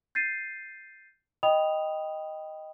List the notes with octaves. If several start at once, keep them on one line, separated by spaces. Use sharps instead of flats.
G6 A6 C7 D#7
D#5 G5 B5 D#6 F7